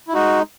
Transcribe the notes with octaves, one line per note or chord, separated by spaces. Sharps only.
E4
G#3 D#4 F#4